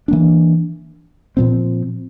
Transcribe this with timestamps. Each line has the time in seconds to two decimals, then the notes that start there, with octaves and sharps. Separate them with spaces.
0.08 E3 A#3 D4
1.37 A#2 F3 C4